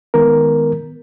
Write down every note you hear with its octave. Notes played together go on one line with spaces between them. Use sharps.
D#3 G#3 B3 A#4